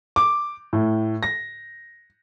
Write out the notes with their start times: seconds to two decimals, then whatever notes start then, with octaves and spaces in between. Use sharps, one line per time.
0.16 D6
0.73 A2
1.23 A#6